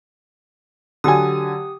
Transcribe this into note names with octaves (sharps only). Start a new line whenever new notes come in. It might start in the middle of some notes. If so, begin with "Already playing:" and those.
D3 F#3 G4 G#5 D#6